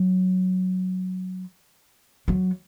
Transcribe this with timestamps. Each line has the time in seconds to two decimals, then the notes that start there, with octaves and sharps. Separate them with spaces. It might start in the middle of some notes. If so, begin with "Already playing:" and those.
Already playing: F#3
2.28 F#3